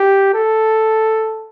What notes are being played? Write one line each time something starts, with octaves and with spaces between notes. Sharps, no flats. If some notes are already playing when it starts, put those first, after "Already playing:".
Already playing: G4
A4